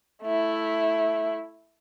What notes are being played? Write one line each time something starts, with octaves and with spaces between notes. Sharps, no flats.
A3 E4